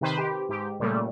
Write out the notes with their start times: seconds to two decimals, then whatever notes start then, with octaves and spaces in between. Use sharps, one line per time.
0.01 C3 D#3 B4 C5
0.18 G4
0.49 G#2 G4
0.80 A#2 C#3 G3 A3